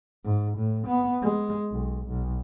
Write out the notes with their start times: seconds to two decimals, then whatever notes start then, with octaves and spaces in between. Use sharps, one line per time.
0.24 G#2
0.58 A2
0.88 B3
1.22 G#3
1.72 B1
2.09 B1